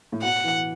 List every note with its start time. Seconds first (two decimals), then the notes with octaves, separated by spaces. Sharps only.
0.12 A2
0.22 B2 F#5
0.44 E3